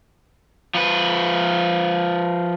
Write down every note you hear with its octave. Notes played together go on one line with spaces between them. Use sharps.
F3 B4